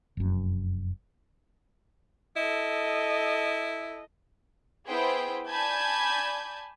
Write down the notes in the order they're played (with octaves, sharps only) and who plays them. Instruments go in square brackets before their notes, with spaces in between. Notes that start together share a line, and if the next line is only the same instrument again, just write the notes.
[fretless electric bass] F1 F#2
[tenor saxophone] E4 [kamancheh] A4 D#5
[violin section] B3 E4 G#4 C5 G5
D5 G#5 A5 B5 G6 G#6